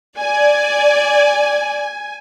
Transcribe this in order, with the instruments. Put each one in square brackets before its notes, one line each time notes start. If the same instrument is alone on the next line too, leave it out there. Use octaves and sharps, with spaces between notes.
[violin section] D5 [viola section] G#5